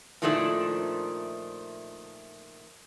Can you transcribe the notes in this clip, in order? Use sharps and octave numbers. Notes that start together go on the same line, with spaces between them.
A#2 D#3 F3 A3 D4 E4